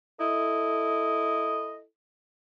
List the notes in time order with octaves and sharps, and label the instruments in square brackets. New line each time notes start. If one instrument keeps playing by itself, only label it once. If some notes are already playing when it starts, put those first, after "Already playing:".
[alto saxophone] E4 [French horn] A4 [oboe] D#5